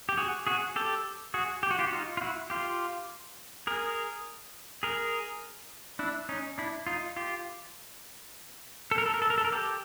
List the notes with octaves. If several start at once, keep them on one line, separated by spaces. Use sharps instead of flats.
G4
F#4 G#4
F#4 G#4
G4 A4
F#4 G#4
G4
F#4
F4 G4
F#4
D#4 F4
F4
E4 F#4
F4 G4
G#4 A#4
G#4 A#4
D4 E4
C#4 D#4
D4 E4
D#4 F4
F4 G4
A4
A#4
A4
A#4
A4
A#4
A4
A#4
G4 A4